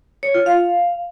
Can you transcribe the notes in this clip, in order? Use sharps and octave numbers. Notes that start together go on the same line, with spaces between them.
C#5
F4
F5